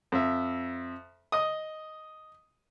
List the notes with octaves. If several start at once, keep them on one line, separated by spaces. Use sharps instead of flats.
F2 E5
D#5 D#6